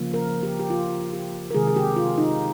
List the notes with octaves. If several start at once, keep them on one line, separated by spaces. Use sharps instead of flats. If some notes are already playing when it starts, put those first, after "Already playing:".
Already playing: C#3 F3 A#3
A#4
G4
G4
F4
G4
A#4
C3 D#3 G#3 G#4
G#4
G4
F4
D#4